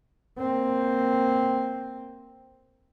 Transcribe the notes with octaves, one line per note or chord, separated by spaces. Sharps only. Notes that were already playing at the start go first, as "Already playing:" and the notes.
A#3 C4